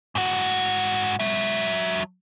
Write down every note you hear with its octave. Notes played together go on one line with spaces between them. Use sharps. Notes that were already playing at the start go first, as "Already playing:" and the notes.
G#2 F#4
F#3 E5